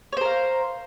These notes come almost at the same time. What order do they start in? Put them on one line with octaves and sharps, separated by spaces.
C#5 C5 A#4 F5